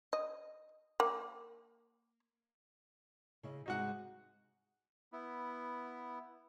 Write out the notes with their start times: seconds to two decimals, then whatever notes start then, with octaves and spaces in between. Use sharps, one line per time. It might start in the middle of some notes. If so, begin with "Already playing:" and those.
0.13 D#5
1.00 A#3
3.43 C#3 E4 D#5
3.66 G#2 C3 G#3 D#4 F#4 F#5
5.13 B3 E4